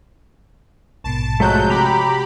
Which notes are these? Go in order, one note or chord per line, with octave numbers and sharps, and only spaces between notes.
A#1 G#2 B2 A5
F2 F#3 G#3 A3 F#6 G6
C3 G4 A#5 B5